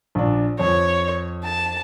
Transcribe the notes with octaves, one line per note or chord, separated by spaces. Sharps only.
A#1 D4
F2 C#5
A5